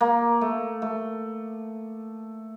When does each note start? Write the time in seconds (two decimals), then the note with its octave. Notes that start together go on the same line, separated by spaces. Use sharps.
0.01 A#3
0.41 A3
0.82 A3